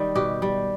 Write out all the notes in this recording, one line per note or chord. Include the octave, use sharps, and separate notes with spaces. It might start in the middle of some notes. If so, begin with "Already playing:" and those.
Already playing: D#3 G3
B2 G4
G3